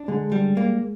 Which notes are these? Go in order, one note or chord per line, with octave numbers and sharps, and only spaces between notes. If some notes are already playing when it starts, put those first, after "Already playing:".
Already playing: D4
D3 G#3
G3
A#3